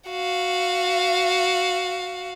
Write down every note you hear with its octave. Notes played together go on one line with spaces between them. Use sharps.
F#4 F5